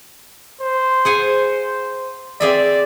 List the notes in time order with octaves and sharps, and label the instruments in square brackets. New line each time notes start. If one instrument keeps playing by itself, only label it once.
[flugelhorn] C5
[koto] G#4 F#5 G#5
[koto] C4 G#4 E5 [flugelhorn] D5